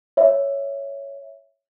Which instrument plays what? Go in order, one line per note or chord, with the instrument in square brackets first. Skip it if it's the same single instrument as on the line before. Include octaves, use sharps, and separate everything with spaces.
[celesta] C#5 E5